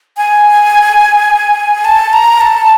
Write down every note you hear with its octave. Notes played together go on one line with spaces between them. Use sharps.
G#5
A5
A#5
A5